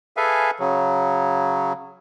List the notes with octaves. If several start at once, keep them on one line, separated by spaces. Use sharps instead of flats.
G#4 A4 B4 E5 F5 G#5
C#3 F#3